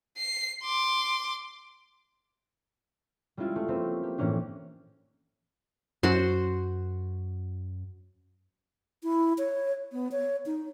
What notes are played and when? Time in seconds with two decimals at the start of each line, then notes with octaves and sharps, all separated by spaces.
0.17 C7
0.63 C6 D6
3.37 G3 G#3 C#4 E4 F4
3.56 A3
3.68 A#3 C4 C#4 G4 B4
4.03 A#3 G4
4.18 A2 E3 A#3 C#4 D4
6.03 F#2 F#4 C5 C6
9.03 E4
9.38 C#5
9.92 B3
10.12 C#5
10.46 D#4